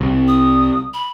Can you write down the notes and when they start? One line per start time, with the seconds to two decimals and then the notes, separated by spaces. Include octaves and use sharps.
0.01 C2
0.28 D#6
0.94 B5